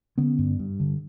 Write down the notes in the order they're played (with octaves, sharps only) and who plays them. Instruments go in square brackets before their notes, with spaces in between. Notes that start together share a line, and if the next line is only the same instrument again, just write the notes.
[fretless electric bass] D3 B3 C#4
G2
G2
D3